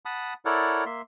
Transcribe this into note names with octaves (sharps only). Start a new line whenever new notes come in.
F#5 A5 B5 D#6
E4 A4 A#4 C#5 D5 F#5
A#3 E5 C6